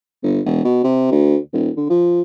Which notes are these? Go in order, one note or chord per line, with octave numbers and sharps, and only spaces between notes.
G1
E1
B2
C3
D2
D#1
D3
F3